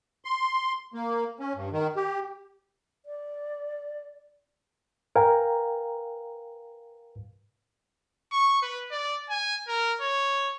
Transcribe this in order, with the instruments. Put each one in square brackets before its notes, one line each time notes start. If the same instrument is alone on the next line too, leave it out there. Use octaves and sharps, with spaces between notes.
[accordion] C6
A#3
C#4
G2
D#3
G4
[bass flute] D5
[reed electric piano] A#4 B4 F5 G5 G#5 A#5
[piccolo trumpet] C#6
B4
D5
G#5
A#4
C#5